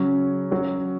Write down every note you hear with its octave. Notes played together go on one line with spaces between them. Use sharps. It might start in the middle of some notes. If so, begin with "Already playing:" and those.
Already playing: C#3 F#3 C#4
F#3 C#4 F#4